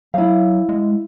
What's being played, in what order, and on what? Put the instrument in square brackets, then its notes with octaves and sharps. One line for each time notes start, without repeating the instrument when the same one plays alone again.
[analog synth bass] F#3 [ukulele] E4 F5
[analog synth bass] G#3